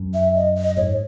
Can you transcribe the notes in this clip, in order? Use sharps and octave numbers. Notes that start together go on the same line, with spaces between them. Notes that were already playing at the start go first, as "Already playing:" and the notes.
Already playing: F#2
E5
D#5
D#5
G#2 C#5